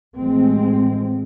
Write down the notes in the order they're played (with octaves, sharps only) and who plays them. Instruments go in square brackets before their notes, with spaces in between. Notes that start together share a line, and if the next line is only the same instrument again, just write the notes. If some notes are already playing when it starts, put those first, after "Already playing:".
[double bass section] A1 A2 F3 G#3 C4